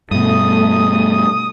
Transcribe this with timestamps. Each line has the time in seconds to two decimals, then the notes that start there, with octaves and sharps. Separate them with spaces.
0.11 G2 B2 A3 D#6